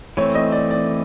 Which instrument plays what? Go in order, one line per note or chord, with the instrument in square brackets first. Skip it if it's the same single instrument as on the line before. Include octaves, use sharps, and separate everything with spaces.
[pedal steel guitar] E3 A3 C4 [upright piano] C#5
[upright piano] D#5
D5
D5